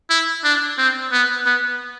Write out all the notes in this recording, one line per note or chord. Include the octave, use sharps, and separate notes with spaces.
E4
D4
C4
B3
B3